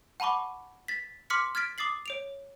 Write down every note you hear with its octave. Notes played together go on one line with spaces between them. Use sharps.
F#5 A5 B5 C#6 D6
A6 B6
C6 D6 F6 B6 C#7
F6 G#6 A6 B6 D7
D6 D#6 A6 C7 F#7
C#5 D7 F7